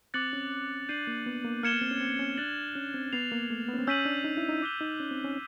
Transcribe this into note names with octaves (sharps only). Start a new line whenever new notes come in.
C4 D6 F#6 A6 C#7 F#7
C#4
D4 G6 C7 D#7 F#7
A#3
B3
A#3
A#3 F6 G#6 C#7 E7 G7
B3
C4
C#4
C4
C#4
D4 F#6 A6 C#7 F#7
C#4
C4
B3 A6 C7 F7
A#3
A3
B3
C#4
C4
C#4 E6 G6 B6 D#7 F#7
D4
D#4
E4
D#4
D6 F#6 B6 E7 G7
D#4
C#4
C4
C#4